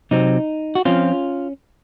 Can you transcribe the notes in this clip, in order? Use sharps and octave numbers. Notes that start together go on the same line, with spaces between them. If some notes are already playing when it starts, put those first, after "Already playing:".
C3 F#3 C4 D#4
F#4
F3 C4 C#4 F4